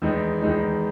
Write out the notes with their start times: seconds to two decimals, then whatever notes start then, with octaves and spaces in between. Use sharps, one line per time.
0.02 E2 D#3 G#3 D#4
0.42 E2 D#3 G#3 D#4